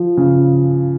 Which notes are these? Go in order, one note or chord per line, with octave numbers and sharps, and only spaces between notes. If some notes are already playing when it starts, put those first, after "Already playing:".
Already playing: F3
C#3